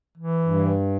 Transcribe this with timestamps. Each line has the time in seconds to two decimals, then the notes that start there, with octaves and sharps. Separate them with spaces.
0.18 E3
0.44 G2